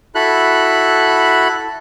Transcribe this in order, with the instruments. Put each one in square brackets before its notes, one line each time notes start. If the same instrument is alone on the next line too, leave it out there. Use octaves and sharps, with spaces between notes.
[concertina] E4 F#4 A4 B5 F#6